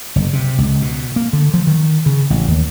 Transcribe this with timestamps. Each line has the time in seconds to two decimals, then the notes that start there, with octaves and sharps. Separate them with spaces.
0.16 F#1
0.33 C3
0.58 C#2
0.82 B2
1.16 A#3
1.33 D3
1.54 F3
1.67 D#3
2.06 C#3
2.30 A1
2.48 D#2